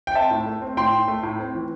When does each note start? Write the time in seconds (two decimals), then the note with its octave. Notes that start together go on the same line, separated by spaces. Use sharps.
0.07 G5
0.15 C4 E5 A5
0.31 A2
0.46 A3
0.62 C4
0.77 A2 G5 C6
0.93 A2
1.08 A3
1.23 A2
1.39 C4
1.55 E3